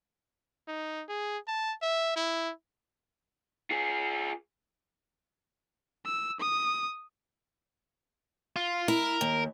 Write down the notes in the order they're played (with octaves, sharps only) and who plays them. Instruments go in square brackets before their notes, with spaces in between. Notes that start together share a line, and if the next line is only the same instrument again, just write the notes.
[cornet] D#4
G#4
A5
E5
E4
[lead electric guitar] F4 G#4
[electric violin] E6
D#6
[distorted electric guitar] F4
[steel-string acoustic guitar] E4 [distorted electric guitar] A#4
[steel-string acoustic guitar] D#2